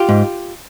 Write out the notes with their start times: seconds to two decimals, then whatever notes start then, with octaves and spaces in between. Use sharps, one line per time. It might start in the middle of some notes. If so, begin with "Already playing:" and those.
Already playing: F4 G4
0.09 G#2